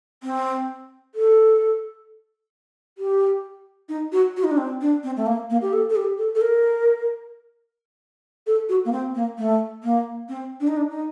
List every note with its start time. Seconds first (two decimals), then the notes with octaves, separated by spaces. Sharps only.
0.23 C4
1.15 A4
2.98 G4
3.89 D#4
4.12 F#4
4.37 F#4
4.44 D#4
4.51 D4
4.58 C4
4.81 D4
5.04 C4
5.17 A3
5.26 A#3
5.50 A#3
5.62 G4
5.73 A4
5.90 A4
5.96 G4
6.18 A4
6.35 A4
6.41 A#4
8.47 A4
8.69 F#4
8.85 A#3
8.92 C4
9.15 A#3
9.38 A3
9.83 A#3
10.29 C4
10.61 D4
10.68 D#4
10.77 D4
10.91 D#4